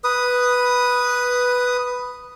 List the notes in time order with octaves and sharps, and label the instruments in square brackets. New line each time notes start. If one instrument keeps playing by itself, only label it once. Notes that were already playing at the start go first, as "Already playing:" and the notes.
[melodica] B4 D#6